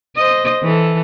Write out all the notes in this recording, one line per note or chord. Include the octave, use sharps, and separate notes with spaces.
C5 D#5
E3 A4